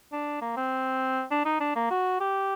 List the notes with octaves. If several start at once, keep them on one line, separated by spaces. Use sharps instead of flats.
D4
A#3
C4
D4
D#4
D4
A#3
F#4
G4